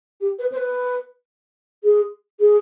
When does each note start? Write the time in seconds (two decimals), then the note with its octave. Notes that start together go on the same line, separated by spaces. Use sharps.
0.21 G4
0.39 B4
0.52 C5
0.57 B4
1.84 G#4
2.40 G#4